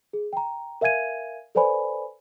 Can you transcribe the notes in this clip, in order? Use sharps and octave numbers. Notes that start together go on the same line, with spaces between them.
G#4
G5 A#5
A#4 E5 F5 G#5 G#6 D#7
A4 B4 C5 D5 G#5 B5